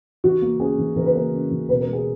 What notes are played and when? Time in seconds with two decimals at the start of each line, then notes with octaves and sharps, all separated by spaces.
0.24 E3 F#4
0.42 A#3
0.60 C#4 G#4
0.78 E3
0.96 E3 A#4
1.06 B4
1.15 A#3 A#4
1.33 C#4
1.51 E3
1.69 B2 B4
1.81 A#4
1.87 G#3
1.93 G#4